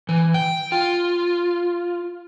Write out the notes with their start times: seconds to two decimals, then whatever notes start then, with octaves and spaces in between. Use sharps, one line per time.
0.09 E3
0.34 G5
0.72 F4